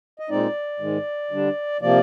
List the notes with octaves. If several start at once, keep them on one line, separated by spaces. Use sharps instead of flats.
D#5
A#2 G#3 C4 D#4 D5
G#2 D#3 G#3
D3 G3 D4
C3 F3 A#3 D5